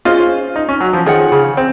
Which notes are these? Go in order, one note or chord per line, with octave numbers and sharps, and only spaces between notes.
C#4 F4 G#4 C5 D#5
D#4
C#4
F#3
F3
D#3 F4 G#4 C#5 F#5
C#3
C4